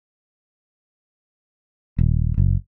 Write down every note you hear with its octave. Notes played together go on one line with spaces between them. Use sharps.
D#1
F#1